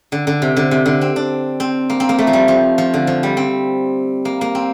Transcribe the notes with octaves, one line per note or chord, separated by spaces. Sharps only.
D3
D3
C3
D3
C3
D3
C4
D4
C4
A#3
C4
A#3
A3
F3
G3
F3
F3
D3
F3
G3
C4
A#3
A#3
C4